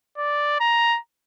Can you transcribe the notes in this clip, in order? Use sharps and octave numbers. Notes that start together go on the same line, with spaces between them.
D5
A#5